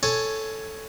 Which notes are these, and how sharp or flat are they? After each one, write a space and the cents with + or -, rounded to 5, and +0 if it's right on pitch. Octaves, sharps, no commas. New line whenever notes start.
A4 +0 C#5 +0 G#5 +10